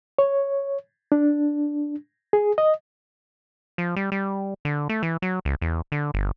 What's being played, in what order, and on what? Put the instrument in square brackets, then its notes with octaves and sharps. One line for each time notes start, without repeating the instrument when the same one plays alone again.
[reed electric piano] C#5
D4
G#4
D#5
[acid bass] F3
G3
G3
D3
A3
E3
F#3
C#2
E2
D3
G1